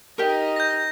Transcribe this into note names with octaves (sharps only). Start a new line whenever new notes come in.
D#4 G4 A#4 D#5
G6 A#6